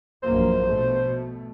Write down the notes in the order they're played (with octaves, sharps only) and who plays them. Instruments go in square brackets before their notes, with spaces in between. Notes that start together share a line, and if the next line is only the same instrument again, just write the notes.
[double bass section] A#1 F#2 A#3 [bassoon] C5
[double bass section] B2 A3